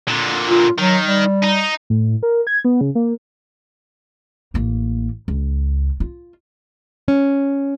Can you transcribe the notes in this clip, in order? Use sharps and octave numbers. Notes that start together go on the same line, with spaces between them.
A#2 D3
F4
D#3 F#3
G3
D#4
A2
A#4
G#6
B3
C#3
A#3
A1 A#3
C#2
F4
C#4